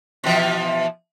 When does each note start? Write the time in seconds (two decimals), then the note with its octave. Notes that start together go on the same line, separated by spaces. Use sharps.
0.24 B2 E3 F3